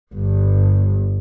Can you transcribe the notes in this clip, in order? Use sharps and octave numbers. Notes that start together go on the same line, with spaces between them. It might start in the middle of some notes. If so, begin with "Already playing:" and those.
G1 G2